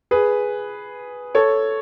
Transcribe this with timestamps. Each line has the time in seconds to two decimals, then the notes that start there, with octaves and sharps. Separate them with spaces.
0.11 G#4 B4
1.35 A4 C#5